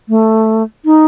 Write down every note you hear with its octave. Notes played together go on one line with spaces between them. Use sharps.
A3
D#4